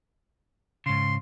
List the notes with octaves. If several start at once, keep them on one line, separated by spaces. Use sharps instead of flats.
G#2 C#3 C6